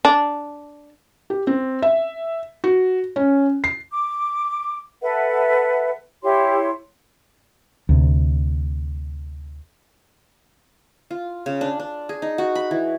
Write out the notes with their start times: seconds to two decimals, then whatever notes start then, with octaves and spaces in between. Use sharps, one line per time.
0.05 D4
1.30 G4
1.47 C4
1.82 E5
2.64 F#4
3.16 C#4
3.64 C7
3.91 D6
5.01 A4 B4 E5 F#5
6.23 E4 G4 C#5 C6
7.89 D2 C3
11.11 F4
11.46 C#3
11.61 D4
11.80 D4
12.09 G#4
12.22 D#4
12.38 F#4
12.55 B5
12.71 E3